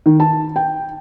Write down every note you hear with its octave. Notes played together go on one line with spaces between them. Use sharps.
D#3
A5
G5